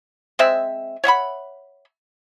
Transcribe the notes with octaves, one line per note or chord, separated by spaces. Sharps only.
G#3 C4 E5
C#5 E5 F#5 B5